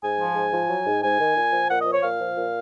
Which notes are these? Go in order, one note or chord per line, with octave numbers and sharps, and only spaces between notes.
G#2 G#5
F3
G#2
F3
F#3
G#2
G#2 G#5
D#3
A#2
F3
A#2 F#5
D#5
F3
C#5
A#2 F5
F3
A#2